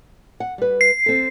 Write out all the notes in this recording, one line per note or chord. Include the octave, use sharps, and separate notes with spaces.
F#5
G3 B4
C7
C4 A4